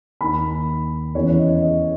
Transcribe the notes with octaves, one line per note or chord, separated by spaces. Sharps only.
D#2 D#3 B5
E2 C#3 E3 C#5
D#5
D#5